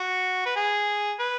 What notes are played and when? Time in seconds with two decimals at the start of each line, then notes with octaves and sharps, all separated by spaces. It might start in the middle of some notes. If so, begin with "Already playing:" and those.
Already playing: F#4
0.46 B4
0.56 G#4
1.20 B4